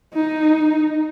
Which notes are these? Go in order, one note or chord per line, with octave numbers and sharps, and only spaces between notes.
D#4